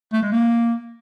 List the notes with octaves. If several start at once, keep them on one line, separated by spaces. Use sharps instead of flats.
A3
G#3
A#3